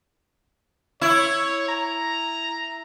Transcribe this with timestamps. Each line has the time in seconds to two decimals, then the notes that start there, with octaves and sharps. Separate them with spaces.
1.02 E4 C#5
1.69 A#5